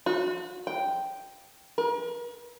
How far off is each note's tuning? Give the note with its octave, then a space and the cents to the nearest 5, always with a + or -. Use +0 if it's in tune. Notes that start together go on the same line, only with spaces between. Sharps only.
F#4 -35
G5 -5
A#4 +45